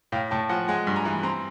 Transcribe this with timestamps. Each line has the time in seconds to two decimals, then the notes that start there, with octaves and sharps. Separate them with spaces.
0.12 A2 F5 G5
0.31 A2 G5 A5
0.49 F3 F#5 G#5
0.68 G#3 F#5 G#5
0.87 G2
0.96 G#5 A#5
1.05 E3
1.23 C4 A#5 C6